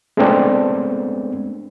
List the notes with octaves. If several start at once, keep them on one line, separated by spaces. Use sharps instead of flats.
G#3 A3 B3 C4 D4